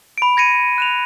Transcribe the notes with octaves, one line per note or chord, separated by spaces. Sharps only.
B5 D7
G#6 A#6 C#7 D#7
F#6 E7 F7